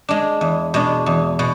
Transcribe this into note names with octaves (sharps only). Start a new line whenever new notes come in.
G#3 D4
E2
B2 G#3 D4
E2
B2